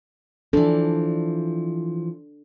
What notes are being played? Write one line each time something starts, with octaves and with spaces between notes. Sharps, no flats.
E3 F3 D4 A4